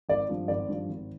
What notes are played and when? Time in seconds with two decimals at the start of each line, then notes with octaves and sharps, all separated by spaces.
0.09 G#1 D5
0.29 G2 F3
0.48 G#1 D5
0.69 G2 F3
0.88 G#1